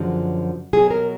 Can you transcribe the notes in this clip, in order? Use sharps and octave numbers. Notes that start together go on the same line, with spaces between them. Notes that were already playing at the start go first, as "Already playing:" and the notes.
Already playing: F#2 D3 F3 G#3 F#4
B2 F#3 G#4
A#4